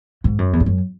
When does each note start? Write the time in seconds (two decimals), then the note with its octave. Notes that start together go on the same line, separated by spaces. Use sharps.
0.24 G#2
0.38 F#2
0.53 E2
0.60 G#2
0.66 F#2